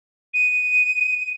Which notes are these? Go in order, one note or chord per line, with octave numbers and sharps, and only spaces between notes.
D#7